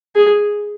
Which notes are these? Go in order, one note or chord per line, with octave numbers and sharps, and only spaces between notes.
G#4